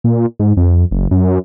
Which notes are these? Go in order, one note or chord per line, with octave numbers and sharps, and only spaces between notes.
A#2
G#2
F2
F#1
F#2